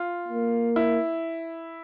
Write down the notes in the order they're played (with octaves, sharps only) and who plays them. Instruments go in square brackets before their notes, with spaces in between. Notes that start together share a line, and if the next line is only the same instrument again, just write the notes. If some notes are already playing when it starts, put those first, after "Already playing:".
Already playing: [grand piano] F4
[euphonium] A#3
[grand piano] E4